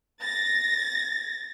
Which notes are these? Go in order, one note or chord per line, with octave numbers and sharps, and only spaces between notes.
A6 A#6